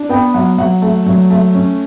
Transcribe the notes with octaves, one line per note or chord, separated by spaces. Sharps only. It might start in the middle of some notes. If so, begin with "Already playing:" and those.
Already playing: D4
B3 G5
F#3 F#5
F#3 F#5
A3
F#3
A3
C#4